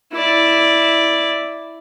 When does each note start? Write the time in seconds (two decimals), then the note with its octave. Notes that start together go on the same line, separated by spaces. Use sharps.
0.13 E4 D5